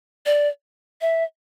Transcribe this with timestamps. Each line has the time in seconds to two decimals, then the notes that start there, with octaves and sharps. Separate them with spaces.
0.26 D5
1.01 E5